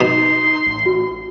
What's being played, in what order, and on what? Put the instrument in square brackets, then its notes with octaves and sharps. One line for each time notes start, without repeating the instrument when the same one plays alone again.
[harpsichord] B2 [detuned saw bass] D#4 [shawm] C6
[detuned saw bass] A1
[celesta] F#4